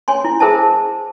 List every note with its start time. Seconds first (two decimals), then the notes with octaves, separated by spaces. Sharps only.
0.08 C#5 G#5 C6
0.24 E4
0.40 G#4 A#4 C5 E5 A5